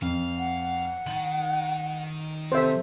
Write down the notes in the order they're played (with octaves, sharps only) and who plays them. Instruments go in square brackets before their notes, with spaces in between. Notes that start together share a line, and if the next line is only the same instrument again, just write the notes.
[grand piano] F2 [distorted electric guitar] F5
[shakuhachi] F#5
[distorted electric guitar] D#3 [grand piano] F#7
[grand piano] C3 A4 [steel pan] C5 E5